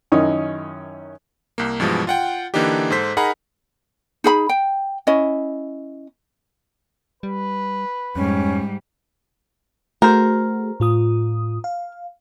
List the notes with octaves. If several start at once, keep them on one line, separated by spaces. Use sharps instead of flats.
F#2 D#3 C#4 D#4 E4 D#6
C2 A#3
G2 B2 E3 F3 G#3
F4 F#5 G5
D3 E3 A#3 D4 D#4 G4
G#2 A4 C5 B6
D#4 G#4 A#4 F#5 A#5 B5
D#4 G#4 B5
G5
C#4 E4 D#5
G3 B4
F2 G#2 G3 C#4
A3 F#4 G#4 A#4 C5
A2 F4 D#6
F5